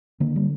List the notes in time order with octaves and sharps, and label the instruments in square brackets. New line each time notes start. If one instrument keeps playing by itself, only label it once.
[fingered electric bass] D3 A#3
G3